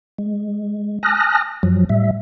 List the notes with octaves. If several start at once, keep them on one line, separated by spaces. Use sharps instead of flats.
G#3
G#5 A5 D#6 F6 F#6 A#6
F#2 F3 F#3
A2 G3 E5